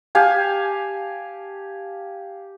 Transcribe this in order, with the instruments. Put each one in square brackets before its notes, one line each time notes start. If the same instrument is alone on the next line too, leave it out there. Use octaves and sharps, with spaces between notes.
[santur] G4 F5 G#5 A5